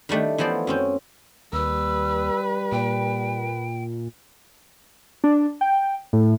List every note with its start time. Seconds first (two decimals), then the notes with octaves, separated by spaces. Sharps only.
0.09 D#3 G3 A3 D4
0.38 E3 F3 B3 C5 D5
0.67 F#2 C4 C#4
1.53 D#2 G3 B4 E6
2.72 A#2 G5
5.24 D4
5.61 G5
6.13 A2